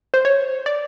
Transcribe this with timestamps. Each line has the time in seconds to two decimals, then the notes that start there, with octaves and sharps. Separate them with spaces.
0.14 C5
0.25 C#5
0.66 D5